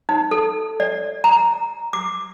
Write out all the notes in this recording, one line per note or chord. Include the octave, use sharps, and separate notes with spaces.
D#4
A4
D5
A#5
D6